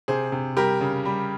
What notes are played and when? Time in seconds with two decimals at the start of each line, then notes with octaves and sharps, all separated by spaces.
0.08 C3 G#4 C5
0.32 C3
0.57 G3 G4 A#4
0.81 C#3
1.05 G3